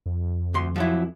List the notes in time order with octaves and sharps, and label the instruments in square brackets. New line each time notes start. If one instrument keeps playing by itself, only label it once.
[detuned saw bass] F2
[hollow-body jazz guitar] D2 C6
F3 F#3 E4